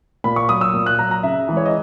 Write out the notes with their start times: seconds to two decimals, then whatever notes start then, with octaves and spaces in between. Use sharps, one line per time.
0.24 A#2 B5
0.36 C#6
0.49 F#3 D#6
0.61 E6
0.74 A#2
0.86 F#6
0.99 F#3 A#5
1.11 A#5
1.23 C#3 E5
1.48 E3 G#3
1.57 C#5
1.65 D#5